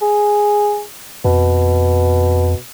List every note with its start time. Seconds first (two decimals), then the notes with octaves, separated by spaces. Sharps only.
0.02 G#4
1.25 F2 B2